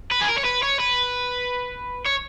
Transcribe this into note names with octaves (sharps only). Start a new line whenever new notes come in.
B4
G#4
A#4
C#5
B4
C#5
B4
C#5